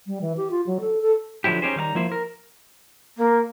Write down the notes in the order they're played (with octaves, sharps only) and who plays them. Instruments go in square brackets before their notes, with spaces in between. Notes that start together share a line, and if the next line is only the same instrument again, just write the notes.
[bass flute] G3
E3
G4
F4
F#3
A4
A4
[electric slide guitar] D3 F3 F#3 E4 G4
C#4 D#4 G4 G#4 C5
D#3 G3 F5 A#5
F3 A#3 E4 C5
A#4
[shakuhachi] A#3